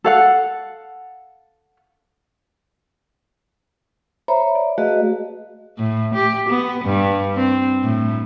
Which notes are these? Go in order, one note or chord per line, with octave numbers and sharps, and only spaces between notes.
A4 F5 F#5
C5 C#5 E5 A#5 B5
D5
A3 F#4 G#4 B4 D#5 F5
A2
G4
B3
G2
C4
A2